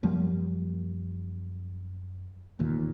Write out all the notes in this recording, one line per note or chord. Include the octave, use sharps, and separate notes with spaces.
F#2 F3 G3 A#3
E1 A1 D#2 A#2